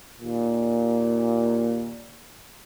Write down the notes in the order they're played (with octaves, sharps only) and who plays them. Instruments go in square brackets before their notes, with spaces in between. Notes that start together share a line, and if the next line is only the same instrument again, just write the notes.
[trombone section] D#2 A#2